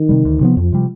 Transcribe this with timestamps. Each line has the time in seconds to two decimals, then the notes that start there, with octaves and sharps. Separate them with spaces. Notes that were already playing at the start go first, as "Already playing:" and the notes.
Already playing: D#3
0.09 C3 G3
0.25 D2
0.41 C3 F3 B3
0.57 F2 F3
0.72 C3 G3